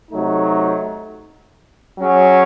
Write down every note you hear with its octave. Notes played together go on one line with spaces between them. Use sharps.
C3 F#3 A3 D#4
F#3 C#4 G#4